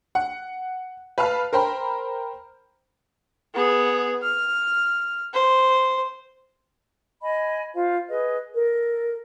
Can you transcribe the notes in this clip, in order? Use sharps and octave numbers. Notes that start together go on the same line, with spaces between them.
F#5
B4 F5 A5 F6
A#4 C5 G5 B5
B3 G#4
F6
C5
D#5 G#5 B5
F4 C5 F5
G#4 B4 D#5
A4 A#4